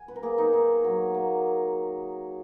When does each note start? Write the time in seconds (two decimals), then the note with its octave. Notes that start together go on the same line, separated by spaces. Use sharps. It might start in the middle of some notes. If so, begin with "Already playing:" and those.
Already playing: G#5
0.08 B4
0.16 A#4
0.23 A#3 G#4
0.38 D#4
0.53 D#3 D#4
0.84 F#3
1.14 A#3